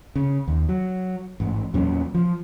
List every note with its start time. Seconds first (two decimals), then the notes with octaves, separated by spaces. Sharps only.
0.16 C#3
0.48 D#2
0.69 F#3
1.40 A1 G#2
1.74 E2 A#2 F#3 C#4
2.15 F3